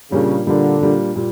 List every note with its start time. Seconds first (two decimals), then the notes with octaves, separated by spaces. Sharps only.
0.11 A#2 C#3 G3 A#3 D4
0.46 A#2 D3 G3 A#3 D4
0.81 A#2 G3 A#3 D4
1.16 A#2 G3